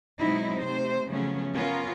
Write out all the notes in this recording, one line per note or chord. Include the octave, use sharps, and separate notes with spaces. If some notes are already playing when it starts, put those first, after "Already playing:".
B2 F#3 G#3 C4 D#4 E4
C3 A3 C5
C#3 F3 F#3 A3 B3 C#4
B3 C#4 F4 A#4